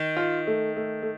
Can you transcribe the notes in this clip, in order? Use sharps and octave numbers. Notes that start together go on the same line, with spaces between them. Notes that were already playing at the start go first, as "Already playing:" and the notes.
Already playing: D#3
F4
A3
A3
A3